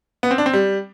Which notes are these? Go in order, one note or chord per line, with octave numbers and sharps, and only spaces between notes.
B3
C4
D4
C4
G3